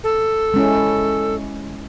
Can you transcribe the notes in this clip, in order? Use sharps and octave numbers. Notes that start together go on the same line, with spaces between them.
A4
G#3 C#4 E4